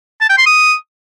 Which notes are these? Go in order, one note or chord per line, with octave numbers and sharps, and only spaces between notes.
A5
G5
C6
D#6